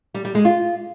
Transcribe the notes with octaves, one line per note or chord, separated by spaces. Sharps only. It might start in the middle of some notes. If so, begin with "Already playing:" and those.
G3
G3
G#3
F4